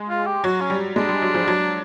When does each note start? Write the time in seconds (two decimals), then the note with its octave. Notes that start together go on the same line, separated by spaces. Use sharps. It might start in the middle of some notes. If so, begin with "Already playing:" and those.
Already playing: G#3
0.09 F4
0.26 G4
0.44 F#3 F#4
0.61 C#4
0.70 G3
0.96 G#3 D4
1.09 G3
1.22 F#3
1.35 F3
1.47 F#3